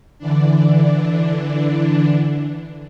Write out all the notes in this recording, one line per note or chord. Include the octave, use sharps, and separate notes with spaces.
D3 E3 D4